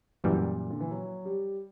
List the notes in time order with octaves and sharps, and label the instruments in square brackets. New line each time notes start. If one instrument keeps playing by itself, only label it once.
[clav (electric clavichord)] F#2 E3 G3 [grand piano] A#2
[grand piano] D3
E3
F#3
G3